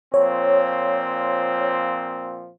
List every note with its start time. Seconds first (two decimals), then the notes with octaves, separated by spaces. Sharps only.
0.14 A#2 F3 C4 C#5